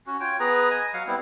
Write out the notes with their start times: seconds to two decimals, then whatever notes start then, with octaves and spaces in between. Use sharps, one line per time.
0.07 C#4 F#4
0.20 F4 C#5 G5
0.40 B3 G#4 B4 A#5
0.70 D#5 G#5 D#6
0.94 F#3 F5 F#5
1.07 G3 B3 C4 E4